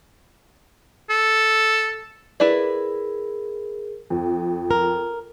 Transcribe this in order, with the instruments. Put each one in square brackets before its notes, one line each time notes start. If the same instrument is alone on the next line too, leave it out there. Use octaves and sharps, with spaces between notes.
[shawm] A4
[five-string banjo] E4 B4 D5 [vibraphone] G#4 A#4
[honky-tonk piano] F2
[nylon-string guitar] A#4